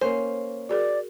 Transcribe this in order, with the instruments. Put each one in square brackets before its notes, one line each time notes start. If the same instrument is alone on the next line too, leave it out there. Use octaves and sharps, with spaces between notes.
[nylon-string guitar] A#3 C#4 [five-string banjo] C5
[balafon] F#4 G#4 A#4 [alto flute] D5